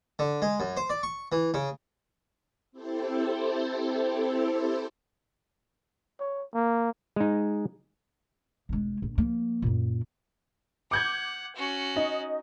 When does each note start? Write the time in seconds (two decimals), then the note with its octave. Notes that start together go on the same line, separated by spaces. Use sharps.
0.19 D3
0.42 G#3
0.60 F#2
0.77 C5
0.90 D5
1.03 C#6
1.32 E3
1.54 C#3
2.72 C4 E4 G4 A4 C5
6.20 C#5
6.55 A#3
7.16 G#3 D#4
8.69 E1 G#3
9.02 A#1
9.18 F3 A#3
9.62 F#2 A#2
10.91 F#5 D6 G6 G#6
11.56 C#4 F#4
11.96 D#4 D#5